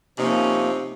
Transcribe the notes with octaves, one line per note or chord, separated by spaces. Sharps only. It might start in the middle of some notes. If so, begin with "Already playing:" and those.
C3 F3 A#3 C#4 D#4